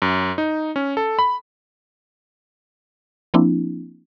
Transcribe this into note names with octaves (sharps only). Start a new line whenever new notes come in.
F#2
D#4
C#4
A4
B5
F3 A#3 C4 D4 E4